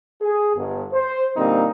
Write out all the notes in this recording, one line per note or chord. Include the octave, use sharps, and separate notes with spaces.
G#4
G1
C5
A#2 D3 G3 A#3 C4 D#4